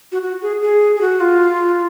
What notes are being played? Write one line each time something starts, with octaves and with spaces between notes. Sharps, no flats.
F#4
F#4
G#4
G#4
G#4
F#4
F4